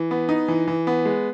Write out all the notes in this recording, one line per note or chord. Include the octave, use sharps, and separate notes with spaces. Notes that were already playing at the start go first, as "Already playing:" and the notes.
Already playing: E3
B3
D#4
E3
E3
B3
G#3